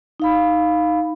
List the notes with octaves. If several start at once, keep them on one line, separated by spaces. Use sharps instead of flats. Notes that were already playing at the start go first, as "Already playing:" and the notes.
D#4 F5 B5